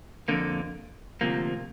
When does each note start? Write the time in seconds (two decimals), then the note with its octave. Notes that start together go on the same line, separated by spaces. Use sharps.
0.28 F2 D3 A#3
1.21 D2 C3 F3 A#3